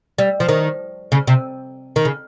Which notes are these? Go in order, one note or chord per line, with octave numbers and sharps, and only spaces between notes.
G3
F3
D#3
C#3
C3
D#3
C#3